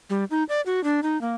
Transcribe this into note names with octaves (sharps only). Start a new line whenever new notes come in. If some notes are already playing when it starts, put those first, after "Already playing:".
G3
D#4
D5
F#4
D4
D#4
A#3